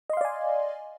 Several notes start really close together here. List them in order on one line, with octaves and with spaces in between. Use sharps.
D#5 C6 F5 D5 G#5